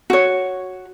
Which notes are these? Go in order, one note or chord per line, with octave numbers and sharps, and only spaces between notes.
F#4 C#5